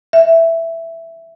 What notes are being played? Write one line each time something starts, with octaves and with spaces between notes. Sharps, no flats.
E5